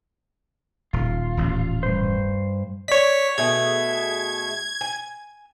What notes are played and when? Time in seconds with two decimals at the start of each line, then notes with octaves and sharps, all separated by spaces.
0.93 D#1 F4
1.37 D#1 A1
1.83 G2 C5
2.88 C#5 D5 B6
3.38 B2 A3 G#4 G#6
4.81 G#5